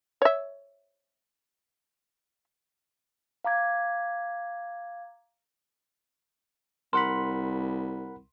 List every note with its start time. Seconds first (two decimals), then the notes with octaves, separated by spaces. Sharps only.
0.22 C#5 E5
3.44 F5 A#5 D6 G#6
6.93 C2 A#4 F#5 B5 C6